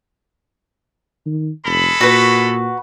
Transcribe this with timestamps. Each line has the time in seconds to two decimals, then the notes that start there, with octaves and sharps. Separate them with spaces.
1.26 D#3
1.66 F1 G#3 A4 B5
2.01 A#2 F#4 B4